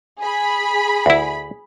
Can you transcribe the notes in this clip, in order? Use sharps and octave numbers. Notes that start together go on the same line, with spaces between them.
G#4 B5
D2 E4